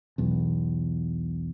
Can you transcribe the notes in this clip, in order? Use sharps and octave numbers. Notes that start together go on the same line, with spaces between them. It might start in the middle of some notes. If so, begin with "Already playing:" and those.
B1 E2